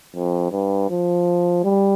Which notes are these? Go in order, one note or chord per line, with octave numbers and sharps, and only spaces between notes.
F2
G2
F3
G3